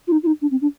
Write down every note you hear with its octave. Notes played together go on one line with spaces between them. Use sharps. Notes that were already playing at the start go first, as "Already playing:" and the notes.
F4
D#4
F4
D#4
D4
C4
D4